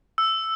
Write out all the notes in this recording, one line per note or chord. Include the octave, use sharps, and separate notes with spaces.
E6